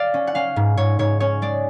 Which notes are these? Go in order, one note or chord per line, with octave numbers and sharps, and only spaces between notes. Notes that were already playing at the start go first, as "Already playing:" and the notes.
Already playing: D5 F5
C#4
F#5
C#4 F5
G#2
G#2 C#5
G#2 C#5
C#4 C#5
G#3 D5